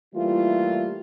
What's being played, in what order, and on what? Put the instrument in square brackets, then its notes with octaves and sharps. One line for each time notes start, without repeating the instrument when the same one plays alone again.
[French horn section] E3 G3 A3 A#3 E4 F4